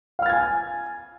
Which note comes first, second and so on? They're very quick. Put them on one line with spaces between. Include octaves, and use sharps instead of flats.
F5 F6 A6 G#6 G#5